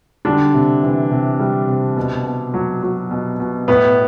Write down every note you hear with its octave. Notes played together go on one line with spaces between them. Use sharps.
D3 G3 D4
C3
E3
C3
G3
C3
B2
B2
F#3
F#3
B2
B2
A2 B3